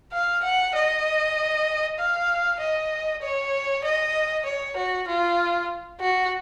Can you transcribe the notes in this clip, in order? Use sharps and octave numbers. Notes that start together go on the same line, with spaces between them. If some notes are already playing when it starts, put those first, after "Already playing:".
F5
F#5
D#5
F5
D#5
C#5
D#5
C#5
F#4
F4
F#4